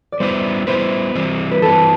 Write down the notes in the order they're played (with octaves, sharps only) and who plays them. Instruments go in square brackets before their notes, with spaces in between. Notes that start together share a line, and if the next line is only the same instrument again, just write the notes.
[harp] D5
[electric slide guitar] G3 B3 E4 B4 [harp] C5
[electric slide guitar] G3 B3 E4 B4 [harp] C5
[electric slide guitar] E3 G3 C4
[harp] B4
[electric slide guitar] E3 G3 C4 [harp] A4